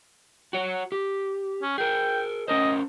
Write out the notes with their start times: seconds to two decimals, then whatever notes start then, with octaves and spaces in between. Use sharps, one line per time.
0.53 F#4 C#5
0.92 G4
1.62 C#4
1.78 G#4 A#4 G5
2.48 C#4 A#4 C5 D#5